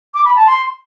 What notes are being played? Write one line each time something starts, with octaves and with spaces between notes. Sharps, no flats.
D6
B5
A5
C6